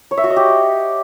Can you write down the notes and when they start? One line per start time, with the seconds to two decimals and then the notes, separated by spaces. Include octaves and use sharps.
0.11 C#5
0.17 E5
0.24 F#4
0.30 D#5
0.37 G4